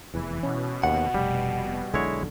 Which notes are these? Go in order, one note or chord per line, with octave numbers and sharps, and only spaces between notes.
F1 E2 E3
B2 C#4
D#2 F#5
F1 G3
B1 D3 G#3 E4 C#5